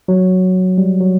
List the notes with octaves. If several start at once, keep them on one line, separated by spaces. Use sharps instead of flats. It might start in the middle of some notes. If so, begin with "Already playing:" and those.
F#3
G3
F#3